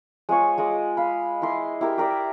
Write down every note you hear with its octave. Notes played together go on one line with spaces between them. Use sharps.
G#3 F4 G#4 C#5
G#3 D#5 D6
F5 B5
E4 D#5 C6 D6
E4 G4 A#4
G4 A#4 D5 E5